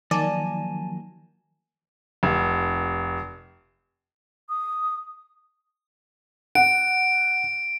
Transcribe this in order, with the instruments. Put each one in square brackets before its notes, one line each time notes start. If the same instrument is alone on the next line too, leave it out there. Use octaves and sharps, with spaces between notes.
[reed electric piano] D#3 [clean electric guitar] F3 F#3 A#3 [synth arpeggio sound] D5 [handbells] G#5 A5
[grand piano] F1
[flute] D#6
[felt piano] F#5 [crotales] D7